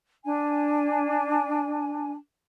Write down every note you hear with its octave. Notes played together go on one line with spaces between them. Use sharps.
D4 G#5